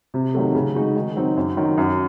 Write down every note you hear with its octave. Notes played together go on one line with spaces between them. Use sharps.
C3
D#3 F#3 A3
C#3
G#3 D#4 F#4
D#3
F#3 C4 D#4
F#2
D#3 F#3
F#2